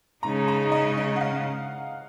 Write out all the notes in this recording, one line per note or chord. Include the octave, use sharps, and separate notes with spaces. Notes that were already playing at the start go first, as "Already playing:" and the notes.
C#3 G#3 D#4 A#5
A#5
D#5
D#5
F#5
F5